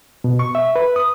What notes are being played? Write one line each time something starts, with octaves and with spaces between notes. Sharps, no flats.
B2
C#6
E5
B4
D#6